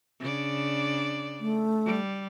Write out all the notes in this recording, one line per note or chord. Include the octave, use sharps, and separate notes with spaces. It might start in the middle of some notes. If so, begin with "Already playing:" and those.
C#3 D4 D5
A3
G3